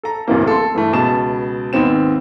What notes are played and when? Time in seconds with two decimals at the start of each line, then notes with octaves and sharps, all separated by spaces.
0.03 A4 A#5
0.28 D1 G1 C2 E3 A#3
0.47 A4 C6
0.75 G2 E3 A3
0.93 C#2 B2 A5 E7
1.73 D#2 G#2 B3 C4 E7